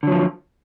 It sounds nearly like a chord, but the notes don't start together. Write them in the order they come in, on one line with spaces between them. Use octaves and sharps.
D3 F#3 F3